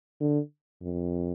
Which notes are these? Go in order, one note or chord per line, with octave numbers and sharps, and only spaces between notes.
D3
F2